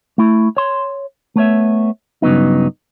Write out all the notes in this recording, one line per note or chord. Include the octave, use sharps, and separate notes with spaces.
A3 E4
C#5 C6
A3 B3 C#5 E5
G2 C#3 F#3 B3 D#4